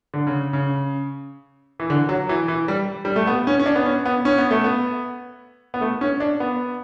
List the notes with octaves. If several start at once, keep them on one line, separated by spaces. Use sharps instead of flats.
D3
C#3
C#3
E3
D3
F#3
E3
E3
G3
G3
A3
B3
C#4
C#4
D4
B3
C#4
B3
C#4
B3
A3
B3
B3
A3
C#4
D4
B3